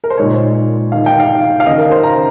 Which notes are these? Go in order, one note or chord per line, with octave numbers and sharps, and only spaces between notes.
A#4
C5
A#2 G#3 D#4 C#5
D#3 A#3 D#4 F5
G5
F5
F5
D#3 A#3 C#4 D#5
A#4
C5
A#5